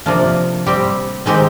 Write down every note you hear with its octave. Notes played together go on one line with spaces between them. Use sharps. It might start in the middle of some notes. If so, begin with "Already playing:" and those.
C3 F3 A#3 D4
G3 C4 G4
D#3 G#3 C4 D#4 G4